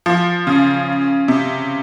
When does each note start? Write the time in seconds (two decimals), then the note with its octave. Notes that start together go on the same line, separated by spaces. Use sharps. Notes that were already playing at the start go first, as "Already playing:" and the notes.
0.06 F3
0.47 C#3
1.28 C3